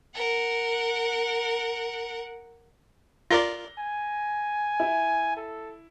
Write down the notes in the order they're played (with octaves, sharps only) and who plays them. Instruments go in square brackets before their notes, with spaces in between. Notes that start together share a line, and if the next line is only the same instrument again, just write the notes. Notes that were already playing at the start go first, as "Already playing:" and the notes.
[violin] A#4 F#5
[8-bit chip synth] F4 A#4 D5 [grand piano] A#6 G7
[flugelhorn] G#5
[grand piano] E4
[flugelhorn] A4